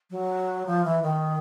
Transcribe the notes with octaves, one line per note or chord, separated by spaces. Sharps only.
F#3
F3
E3
D#3